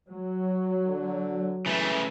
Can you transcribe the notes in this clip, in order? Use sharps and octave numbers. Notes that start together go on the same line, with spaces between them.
F#3
D3
C#3 E3 A3